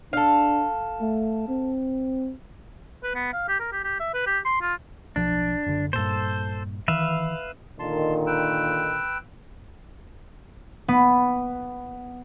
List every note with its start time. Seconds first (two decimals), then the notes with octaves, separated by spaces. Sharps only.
0.13 D4 A4 F5
1.01 A3
1.48 C4
3.04 B4
3.15 B3
3.33 F5
3.48 G4
3.60 A#4
3.72 G4
3.84 G4
4.00 E5
4.14 B4
4.26 G4
4.45 C6
4.62 F4
5.16 B1 F3 D4
5.66 F#1 D3
5.93 G2 A#2 A4 C5
6.88 D#3 E3 B4 E5 F5
7.79 A#2 D3 D#3 A5 C6
8.27 B4 G5 E6
10.88 B3